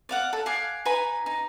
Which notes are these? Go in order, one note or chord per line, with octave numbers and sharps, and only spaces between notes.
D5 F5 F#5
A4
F5 F#5 G#5 D6
D#4 B4 G#5 B5
D#4